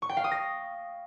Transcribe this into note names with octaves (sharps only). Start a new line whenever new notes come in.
C#6
G5
F5
D#6
A#6